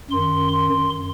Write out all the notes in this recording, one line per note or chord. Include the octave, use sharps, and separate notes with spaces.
F#2 D#3 C6
C6